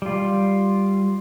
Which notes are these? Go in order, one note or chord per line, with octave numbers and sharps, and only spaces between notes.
G3 F4